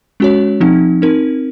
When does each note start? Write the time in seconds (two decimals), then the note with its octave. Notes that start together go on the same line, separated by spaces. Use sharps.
0.20 G#3 C#4 F#4 C#5
0.60 F3 C4 D#4
1.02 C4 D#4 A#4